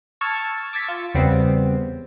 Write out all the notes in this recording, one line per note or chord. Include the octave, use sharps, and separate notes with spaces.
A5 C#6 E6 F6 G#6 A6
D6 E6 G#6 A6 B6 C#7
F4
E2 C#3 G3 B3 C4